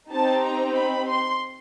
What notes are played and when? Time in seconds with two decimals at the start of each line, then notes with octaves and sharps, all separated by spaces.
0.11 C4 D#4 G4 A5
0.43 A#5
0.76 B5
1.07 C6